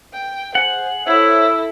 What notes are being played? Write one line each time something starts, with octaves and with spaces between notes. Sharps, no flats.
G5
G#4 C5 F#5
E4 A4 C5 C#5 E5 E6